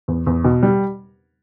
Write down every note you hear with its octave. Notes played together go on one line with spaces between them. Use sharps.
E2
E2
B2
G3